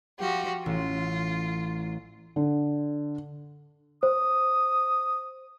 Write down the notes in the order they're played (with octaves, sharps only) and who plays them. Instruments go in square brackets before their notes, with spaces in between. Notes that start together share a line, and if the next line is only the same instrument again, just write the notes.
[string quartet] F3 F#4 G4
[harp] A1 [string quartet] F4
[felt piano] D3
[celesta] C5 [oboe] D#6